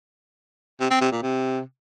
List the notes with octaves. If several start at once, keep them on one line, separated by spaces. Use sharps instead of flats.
C3
C4
C3
A#2
C3